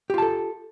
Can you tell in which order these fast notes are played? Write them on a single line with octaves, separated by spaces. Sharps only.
G4 F4 A5 A4